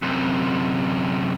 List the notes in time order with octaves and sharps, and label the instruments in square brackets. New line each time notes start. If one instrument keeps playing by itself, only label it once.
[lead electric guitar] F#2 C3